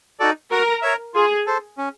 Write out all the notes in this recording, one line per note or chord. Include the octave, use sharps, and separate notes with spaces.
D#4 F#4 A4 D5
F#4 A#4
A#4 C#5 E5
F4 G#4
A4 C5
C#4